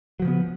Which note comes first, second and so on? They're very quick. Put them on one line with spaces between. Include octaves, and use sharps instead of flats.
F#3 F3 C#3 B3